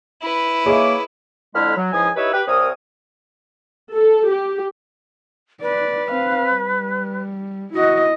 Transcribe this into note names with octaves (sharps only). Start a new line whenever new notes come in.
E4 B4
A#3 G#4 C#5 D#5 E5 D6
F2 D3 G#3 E4 B5 F6
F#3
C#2 G#2 F3 E4 G#5 D#6
D#4 E4 G4 B4 C#5 E5
G4 B4
C2 C4 A#4 C#5 D#6
A4
G4
B4 D5
C4 F5
G3
E4 F#4 D#5